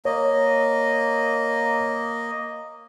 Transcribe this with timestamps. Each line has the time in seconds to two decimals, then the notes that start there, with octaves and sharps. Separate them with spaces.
0.05 A#3 C#5 D#5